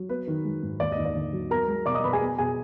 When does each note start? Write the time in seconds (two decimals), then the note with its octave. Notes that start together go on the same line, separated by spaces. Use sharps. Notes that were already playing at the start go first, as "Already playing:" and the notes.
Already playing: F#3
0.09 B3 B4
0.27 D#3
0.45 G#3
0.63 G#2
0.80 D#2 D5
0.92 D#5
0.98 D#2
1.05 D5
1.15 D3
1.33 F#3
1.50 B3 A#4 A#5
1.68 G#3
1.86 B2 D5 D6
1.95 D#5 D#6
2.04 B2 B4 B5
2.13 G#4 G#5
2.22 B3
2.38 B2 G#4 G#5